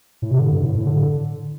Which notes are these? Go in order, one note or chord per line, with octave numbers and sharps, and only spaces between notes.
A2
C3
D3
G2
A2
A2
D3